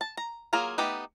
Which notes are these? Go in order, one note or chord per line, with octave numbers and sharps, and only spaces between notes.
A5
A#5
F#3 A#3 F4 G#4 A#5
A3 B3 D#4 G4 B4